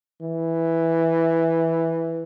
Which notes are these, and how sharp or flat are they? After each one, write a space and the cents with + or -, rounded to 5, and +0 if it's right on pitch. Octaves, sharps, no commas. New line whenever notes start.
E3 +0